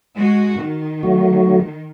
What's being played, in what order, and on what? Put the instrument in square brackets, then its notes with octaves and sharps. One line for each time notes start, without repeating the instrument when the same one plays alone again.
[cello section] G#3 F#4
D#3
[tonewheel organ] F#3 A3 F#4